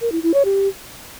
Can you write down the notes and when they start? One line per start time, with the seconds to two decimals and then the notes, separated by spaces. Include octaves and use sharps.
0.01 A#4
0.12 E4
0.23 E4
0.34 C#5
0.45 G4